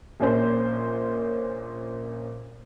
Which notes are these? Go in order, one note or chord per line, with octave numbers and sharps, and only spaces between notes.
A#1 A#2 A#3 C#4 C5